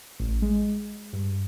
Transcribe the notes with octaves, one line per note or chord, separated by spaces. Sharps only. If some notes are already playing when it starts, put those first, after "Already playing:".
A1
G#3
G2